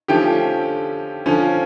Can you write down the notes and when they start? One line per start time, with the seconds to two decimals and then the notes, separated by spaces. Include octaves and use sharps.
0.08 D3 F3 A3 C#4 G4 G5
1.26 D3 F3 C#4